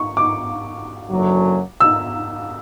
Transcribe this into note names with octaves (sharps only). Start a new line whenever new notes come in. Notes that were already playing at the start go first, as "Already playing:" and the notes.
Already playing: C#6
D6
F#1 F#2 D3 F#3
E6